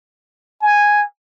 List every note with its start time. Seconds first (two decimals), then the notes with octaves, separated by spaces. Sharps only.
0.62 G#5